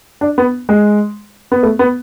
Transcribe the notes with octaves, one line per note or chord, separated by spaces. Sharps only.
D4
B3
G#3
B3
A3
B3